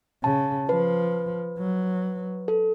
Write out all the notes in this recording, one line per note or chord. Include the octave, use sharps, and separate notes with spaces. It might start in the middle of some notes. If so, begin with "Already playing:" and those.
C#3 A5
F3 B4
F#3
A4